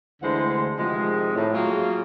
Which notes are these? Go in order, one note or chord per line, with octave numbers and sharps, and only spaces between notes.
D2 D3 E3 G#3 C5 F#5
C3 D#3 F3 G#3
A2
F#3 A#3 F4 G#4